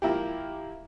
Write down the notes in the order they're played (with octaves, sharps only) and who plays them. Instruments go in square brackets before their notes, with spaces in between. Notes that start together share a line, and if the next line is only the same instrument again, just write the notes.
[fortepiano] F3 A#3 E4 G4